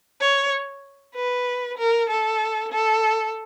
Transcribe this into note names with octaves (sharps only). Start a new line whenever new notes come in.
C#5
B4
A#4
A4
A4